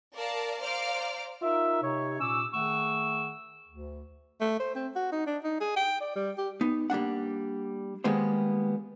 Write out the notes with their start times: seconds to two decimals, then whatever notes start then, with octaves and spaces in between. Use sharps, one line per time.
0.15 A#4 D5 F5 A5
0.62 C5 D5 F5 A#5 D6 F6
1.41 D#4 F4 A#4 E5
1.82 C3 D#4 C#5
2.20 A#2 C#4 C#6 D6 E6
2.54 D#3 A3 G#4 F#5 C#6 E6
3.68 D2
4.41 A3
4.60 C5
4.75 C4
4.96 F#4
5.12 D#4
5.27 D4
5.44 D#4
5.61 G#4
5.76 G5
6.01 D5
6.16 G3
6.38 G4
6.61 B3 D#4
6.90 G3 A#3 D4 F#5
8.04 D#3 G3 G#3 A#3 B3 C5